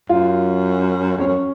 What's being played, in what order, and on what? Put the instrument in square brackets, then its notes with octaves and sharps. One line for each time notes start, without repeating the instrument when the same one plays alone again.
[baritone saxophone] F#2 [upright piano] F4
[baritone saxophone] F2 [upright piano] C#4
[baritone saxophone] F#2